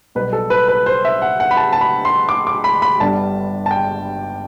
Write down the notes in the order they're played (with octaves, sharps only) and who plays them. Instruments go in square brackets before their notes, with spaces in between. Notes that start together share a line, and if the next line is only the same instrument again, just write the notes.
[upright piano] B1 B2 G3 B4
A4
B4
B4
C5
E5
F#5
F#5
B5
A5
A5
B5
C6
D6
D6
B5
B5
G1 G2 D3 G3 A5
A5
G5